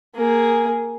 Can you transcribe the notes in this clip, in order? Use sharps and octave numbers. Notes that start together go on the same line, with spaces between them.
A#3 G#4